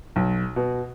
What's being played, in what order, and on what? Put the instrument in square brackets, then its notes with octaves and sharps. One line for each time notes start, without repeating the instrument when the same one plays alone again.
[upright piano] B1
B2